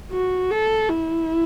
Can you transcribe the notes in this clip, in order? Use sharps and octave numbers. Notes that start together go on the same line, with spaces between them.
F#4
A4
E4